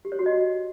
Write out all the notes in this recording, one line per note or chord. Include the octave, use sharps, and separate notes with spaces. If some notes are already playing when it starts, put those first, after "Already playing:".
G4
C#5
F#4
D#5
F#4